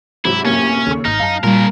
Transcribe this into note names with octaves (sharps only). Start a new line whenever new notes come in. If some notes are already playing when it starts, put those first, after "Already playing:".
G#2 C3 F#3 E4
F#2 A2 C3 A#3 C#4
D#2 C#3 A4 C#6
G#1 D#4 F6
F#2 F5 A5
A#2 C#3 G3 A#3 A#4